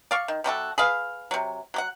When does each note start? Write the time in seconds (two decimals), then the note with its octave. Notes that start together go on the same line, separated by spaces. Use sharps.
0.11 D5 F5 C#6
0.28 D#3
0.44 C3 G3 F#4 A4
0.78 G#4 B4 F5
1.31 C3 F#3
1.74 F#3 G4 F#5